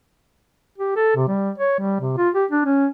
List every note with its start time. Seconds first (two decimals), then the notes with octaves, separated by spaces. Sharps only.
0.78 G4
0.96 A4
1.15 C3
1.28 G3
1.58 C#5
1.80 G3
2.01 C3
2.18 F4
2.35 G4
2.51 D4
2.65 C#4